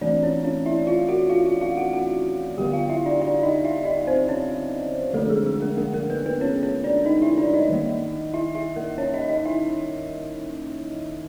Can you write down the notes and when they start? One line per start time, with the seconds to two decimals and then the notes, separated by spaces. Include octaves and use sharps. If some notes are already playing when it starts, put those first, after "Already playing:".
0.01 E3 A3 C4 D4 D5
0.22 C#4 C#5
0.44 C#4 C#5
0.66 E4 E5
0.87 F4 F5
1.08 F#4 F#5
1.29 F4 F5
1.45 F4 F5
1.61 F4 F5
1.77 F#4 F#5
1.93 F#4 F#5
2.58 D3 G3 B3 G4 G5
2.73 F4 F5
2.89 E4 E5
3.05 D4 D5
3.22 D4 D5
3.43 D#4 D#5
3.64 E4 E5
3.85 D#4 D#5
4.07 C4 C5
4.28 C#4 C#5
5.13 D3 F3 A3 A#3 D4 A4
5.29 G#3 G#4
5.46 G#3 G#4
5.62 A#3 A#4
5.77 A#3 A#4
5.93 A#3 A#4
6.10 B3 B4
6.26 B3 B4
6.41 C#4 C#5
6.63 C#4 C#5
6.84 D4 D5
7.06 D#4 D#5
7.22 E4 E5
7.38 D4 D5
7.53 D#4 D#5
7.70 D#3 G3 A#3
8.34 E4 E5
8.55 E4 E5
8.76 A#3 A#4
8.98 C#4 C#5
9.14 D#4 D#5
9.29 D#4 D#5
9.45 E4 E5